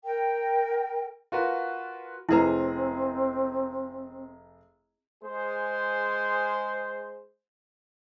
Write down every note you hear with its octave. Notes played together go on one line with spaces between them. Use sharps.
A#4 G5
F4 F#4 A#4 B4
F1 C4 E4 G#4 B4 A#5
G#3 G#4 C5